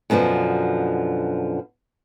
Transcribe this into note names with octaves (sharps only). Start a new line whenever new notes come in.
F#2 B2 D3 D#3 F3